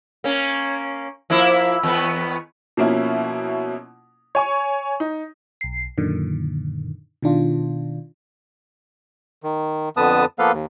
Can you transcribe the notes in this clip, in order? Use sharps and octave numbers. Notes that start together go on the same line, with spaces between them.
A#3 C#4
F3 A#3 E4
E2 B3
B2 F3 A#3 C#4 E4
C#5 G#5 C#6
D#4
B1 C7
F#2 A#2 D3 D#3
B2 D#3 D4 F4
D#3
F2 D3 B3 B4 A5 D#6
F3 A#3 B3 A4 B4 F5
D#2